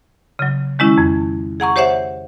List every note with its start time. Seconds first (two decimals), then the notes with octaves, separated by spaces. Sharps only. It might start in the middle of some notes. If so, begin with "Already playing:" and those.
0.39 C#3 F#3
0.79 D#3 G#3 C#4 E4
0.98 F2
1.60 G#4 F#5 A#5 C#6
1.76 G4 C5 C#5 E5 F#5